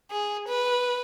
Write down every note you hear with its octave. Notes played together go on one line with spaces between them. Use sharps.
G#4
B4